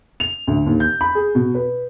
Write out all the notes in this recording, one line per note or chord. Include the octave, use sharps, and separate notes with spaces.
F7
D2
D#2
G6
B5
G#4
B2
B4